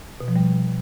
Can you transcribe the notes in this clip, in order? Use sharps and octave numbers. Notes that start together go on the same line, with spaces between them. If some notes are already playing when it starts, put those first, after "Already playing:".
B2
F3
G3